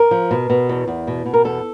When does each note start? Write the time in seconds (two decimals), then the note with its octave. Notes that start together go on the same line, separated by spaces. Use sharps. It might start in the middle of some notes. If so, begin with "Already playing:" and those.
Already playing: A#4
0.11 F3
0.31 B2
0.50 B2
0.69 E2
0.88 E2
1.07 B2
1.26 B2
1.34 A#4
1.45 E2 A4